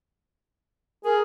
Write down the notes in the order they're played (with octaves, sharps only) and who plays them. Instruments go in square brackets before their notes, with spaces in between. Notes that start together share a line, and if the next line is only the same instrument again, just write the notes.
[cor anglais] G#4 [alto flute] A#4